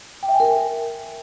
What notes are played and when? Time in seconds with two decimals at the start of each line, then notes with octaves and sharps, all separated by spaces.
0.23 G5
0.28 E5
0.34 G#5
0.40 A#4